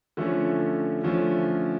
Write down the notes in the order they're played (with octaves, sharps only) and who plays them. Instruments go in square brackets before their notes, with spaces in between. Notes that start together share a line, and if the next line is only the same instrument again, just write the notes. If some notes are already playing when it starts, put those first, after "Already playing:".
[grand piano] D3 F3 A3 C#4
D3 F3 A3 C#4